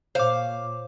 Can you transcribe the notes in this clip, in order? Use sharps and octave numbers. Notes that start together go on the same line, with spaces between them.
A#2 C5 C#5 F5 D6